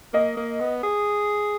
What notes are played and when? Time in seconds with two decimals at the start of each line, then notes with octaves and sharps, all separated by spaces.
0.14 A#3 D#5
0.37 A#3
0.60 B3
0.83 G#4